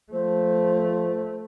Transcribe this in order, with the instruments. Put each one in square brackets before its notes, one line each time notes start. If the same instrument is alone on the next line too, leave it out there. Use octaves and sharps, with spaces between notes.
[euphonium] F3 [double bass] A3 [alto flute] C5